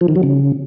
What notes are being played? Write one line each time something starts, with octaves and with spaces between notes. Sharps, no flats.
F3
D#3
F#3
C#3